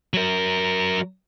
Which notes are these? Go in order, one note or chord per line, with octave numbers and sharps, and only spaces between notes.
F#3 A#4